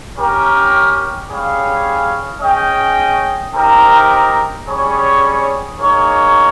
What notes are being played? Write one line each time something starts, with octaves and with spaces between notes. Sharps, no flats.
C#4 G4 A#4
G3 C#4 G#4 C#5 F5
C#4 G#4 D#5 G5
C4 D#4 G4 A#4
G3 C#4 G#4 C#5
A#3 D#4 G#4 C#5